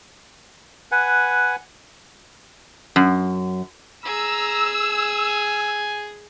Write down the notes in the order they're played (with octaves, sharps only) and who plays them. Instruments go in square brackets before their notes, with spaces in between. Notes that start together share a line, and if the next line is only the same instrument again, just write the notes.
[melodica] B4 F#5 G#5
[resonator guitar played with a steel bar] F#2
[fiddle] G#4 [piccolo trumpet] A#5 [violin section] E6
[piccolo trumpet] G#5